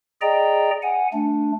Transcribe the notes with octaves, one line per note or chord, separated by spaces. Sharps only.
G#4 D5 D#5 G5 A#5
F#5 G#5
A3 D4